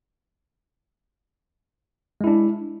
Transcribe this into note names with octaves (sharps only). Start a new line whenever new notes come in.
G#3 D4 E4